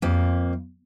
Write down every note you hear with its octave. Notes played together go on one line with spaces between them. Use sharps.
F2 A#3